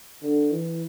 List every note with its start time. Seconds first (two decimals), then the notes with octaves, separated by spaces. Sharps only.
0.22 D3
0.51 E3